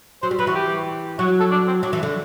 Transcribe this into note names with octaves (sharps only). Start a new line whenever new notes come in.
F#3 C5
G3
F#3 B4
E3 F#4
G4
F#3 F#4
A4
D4
C4
F#3
E3
D3